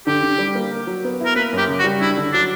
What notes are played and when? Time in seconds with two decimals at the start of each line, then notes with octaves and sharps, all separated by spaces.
0.07 D3 G4
0.23 D3
0.39 G3
0.55 A#3
0.71 A#4
0.87 F#3
1.04 B3
1.20 E4
1.26 A#4
1.36 A#3 B4
1.53 F#2
1.58 G4
1.68 C#3
1.79 F#4
1.84 G3
2.01 D4 E4
2.17 D3
2.33 F#3 D4